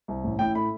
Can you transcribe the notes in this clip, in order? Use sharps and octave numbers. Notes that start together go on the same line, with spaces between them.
C2
A1
A2 G5
A3 B5